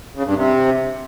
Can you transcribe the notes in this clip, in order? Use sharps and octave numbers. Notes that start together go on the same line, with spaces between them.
C#3
G2
C3